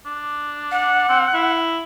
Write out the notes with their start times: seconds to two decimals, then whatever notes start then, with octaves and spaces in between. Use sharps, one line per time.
0.06 D4
0.71 F#5
1.09 C4
1.34 E4